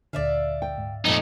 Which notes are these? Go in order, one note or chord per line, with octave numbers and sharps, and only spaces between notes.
D2 A#2 D3 D5 E5 F5
G5
G#2
F2 A#2 A3 D#4 A#6